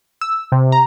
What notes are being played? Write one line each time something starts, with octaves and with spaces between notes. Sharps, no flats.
E6
C3
A#5